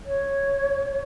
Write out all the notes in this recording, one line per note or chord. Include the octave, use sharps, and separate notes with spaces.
C#5